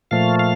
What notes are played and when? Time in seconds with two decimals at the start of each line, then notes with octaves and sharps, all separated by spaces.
0.11 A#2 F3 A3 F5
0.39 F5